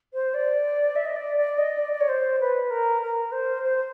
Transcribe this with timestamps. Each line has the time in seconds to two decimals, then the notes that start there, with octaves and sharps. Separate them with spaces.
0.14 C5
0.34 D5
0.96 E5
1.05 D#5
1.16 D5
1.37 D5
1.58 D#5
1.78 D5
1.92 D5
2.00 C#5
2.08 C5
2.40 B4
2.70 A#4
3.01 A#4
3.32 C5
3.63 C5